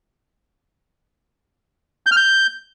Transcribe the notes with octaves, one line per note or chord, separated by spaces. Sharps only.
G6
F6
G6